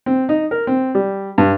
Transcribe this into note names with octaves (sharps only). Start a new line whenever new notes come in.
C4
D#4
A#4
C4
G3
G2